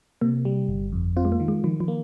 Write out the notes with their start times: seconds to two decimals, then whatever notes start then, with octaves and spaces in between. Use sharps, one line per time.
0.21 C3 A#3
0.45 G3
0.69 G1
0.92 F2
1.17 C4 F4
1.25 G#3
1.32 A#3
1.40 D#3
1.48 G#3
1.64 D#3 F3
1.80 F3
1.88 A#3